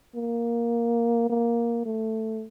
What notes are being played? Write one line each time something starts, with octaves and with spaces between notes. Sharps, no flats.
A#3
A#3
A3